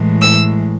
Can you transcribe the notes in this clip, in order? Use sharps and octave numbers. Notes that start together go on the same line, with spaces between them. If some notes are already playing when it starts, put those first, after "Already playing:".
Already playing: A2 E3 G#3
E6